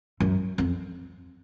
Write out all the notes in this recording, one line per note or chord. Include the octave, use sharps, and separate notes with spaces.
F#2
F2